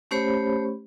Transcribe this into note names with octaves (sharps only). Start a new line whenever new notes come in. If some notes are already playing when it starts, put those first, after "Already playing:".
A3 C#4 G4 C5 C#5 B5